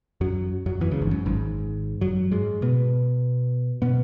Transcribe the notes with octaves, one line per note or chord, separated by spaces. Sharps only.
F#2 F#3
F#2 F#3
E2 E3
C#2 C#3
G#1 G#2
F#2
G#1 G#2
F#2 F#3
G#2 G#3
B2 B3
B2 B3